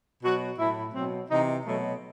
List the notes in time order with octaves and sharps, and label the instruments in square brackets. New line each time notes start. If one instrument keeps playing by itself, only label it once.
[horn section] B2 F#3 F#4
A2 F#3 E4
B2 F#3 C4
C3 E3 D#4
B2 F#3 A3